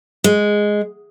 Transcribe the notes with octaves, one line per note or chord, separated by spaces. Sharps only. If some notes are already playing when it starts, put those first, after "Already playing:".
G#3